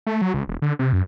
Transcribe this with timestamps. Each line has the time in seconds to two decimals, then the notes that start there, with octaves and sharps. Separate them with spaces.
0.07 A3
0.21 F#3
0.34 C#2
0.48 E1
0.62 D3
0.79 C3
0.93 F#2